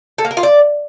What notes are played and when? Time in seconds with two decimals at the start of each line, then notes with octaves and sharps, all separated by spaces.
0.18 A4
0.25 A#3
0.31 A#4
0.37 F4
0.43 D5